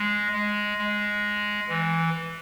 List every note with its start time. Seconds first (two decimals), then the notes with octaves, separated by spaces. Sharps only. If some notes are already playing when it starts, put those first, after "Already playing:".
Already playing: G#3
0.33 G#3
0.78 G#3
1.69 E3